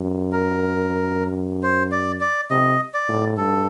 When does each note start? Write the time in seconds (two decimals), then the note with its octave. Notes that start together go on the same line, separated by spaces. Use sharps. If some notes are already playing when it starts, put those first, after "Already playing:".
Already playing: F#2
0.32 A#4
1.63 C5
1.92 D5
2.21 D5
2.50 C3 D#5
2.94 D5
3.08 A2
3.37 G2 A4